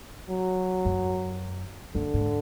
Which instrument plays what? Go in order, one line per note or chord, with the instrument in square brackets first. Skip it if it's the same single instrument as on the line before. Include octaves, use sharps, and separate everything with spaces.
[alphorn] F#3
[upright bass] F#2
[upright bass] F#2 [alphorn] D3
[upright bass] G#2